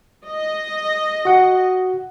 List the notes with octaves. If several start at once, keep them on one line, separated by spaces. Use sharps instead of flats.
D#5
F#4 F#5